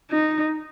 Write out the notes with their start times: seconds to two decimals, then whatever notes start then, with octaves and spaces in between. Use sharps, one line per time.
0.11 D#4